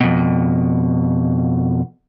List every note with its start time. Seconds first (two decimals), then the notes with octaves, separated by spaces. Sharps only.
0.01 F2 B2